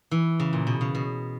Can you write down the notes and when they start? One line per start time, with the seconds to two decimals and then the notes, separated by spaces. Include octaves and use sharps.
0.11 E3
0.40 C#3
0.53 A#2
0.67 B2
0.81 C#3
0.95 B2